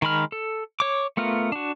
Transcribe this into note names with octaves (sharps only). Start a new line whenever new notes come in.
D#3 G#3 B5 F6
A4
C#5 D6
A3 B3 F4 A#4
D4 F#4